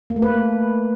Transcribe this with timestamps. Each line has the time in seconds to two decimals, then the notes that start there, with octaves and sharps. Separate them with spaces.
0.10 A#3
0.16 A3
0.22 B4